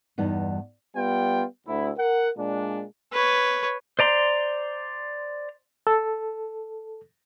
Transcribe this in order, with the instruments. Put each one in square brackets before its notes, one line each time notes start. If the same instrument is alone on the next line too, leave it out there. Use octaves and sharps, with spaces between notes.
[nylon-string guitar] E2 G2 B3 D#4
[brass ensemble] G3 B3 F4 G5
D2 E4
A#4 F#5
A#2 G#3 D4
[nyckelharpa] B4 C#5
[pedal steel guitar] C5 D5 A#5 C6
[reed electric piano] A4